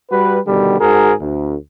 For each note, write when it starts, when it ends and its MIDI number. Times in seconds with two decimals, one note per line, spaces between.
0.10 0.38 55
0.10 0.38 66
0.10 0.38 71
0.47 0.77 47
0.47 0.77 50
0.47 0.77 51
0.47 0.77 55
0.80 1.12 44
0.80 1.12 66
0.80 1.12 68
0.80 1.12 70
1.20 1.54 38